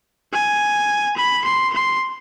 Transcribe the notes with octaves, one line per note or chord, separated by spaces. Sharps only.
G#5
B5
C6
C6